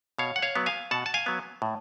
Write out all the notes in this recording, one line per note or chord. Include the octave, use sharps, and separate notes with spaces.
B2 C#5 F5
F#5
C#5 F5
F#3 B3
F5 G#5
B2 F#5 A5
A5
F5 G#5
F#3 B3
A2